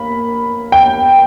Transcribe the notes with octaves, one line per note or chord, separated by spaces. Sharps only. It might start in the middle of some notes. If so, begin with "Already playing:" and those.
Already playing: A#3 B5
G5